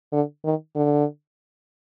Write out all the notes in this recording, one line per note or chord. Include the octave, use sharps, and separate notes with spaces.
D3
D#3
D3